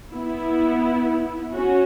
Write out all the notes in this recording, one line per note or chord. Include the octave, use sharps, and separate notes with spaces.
B3 E4
C#4 F#4